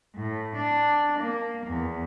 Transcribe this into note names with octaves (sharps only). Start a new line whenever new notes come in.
A2
D4
A#3
E2